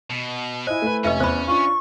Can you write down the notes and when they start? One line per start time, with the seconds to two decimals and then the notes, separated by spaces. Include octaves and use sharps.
0.10 B2
0.67 E4 C5 D#5 G#5
0.82 A3 E4 B4
1.05 F1 C#4 B4 D#5 E5
1.20 E2 C5 B5
1.48 D4 F4 C#6